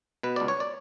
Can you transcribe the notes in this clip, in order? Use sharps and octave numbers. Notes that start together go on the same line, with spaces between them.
B2 B4
C#2 D5
C#5
D5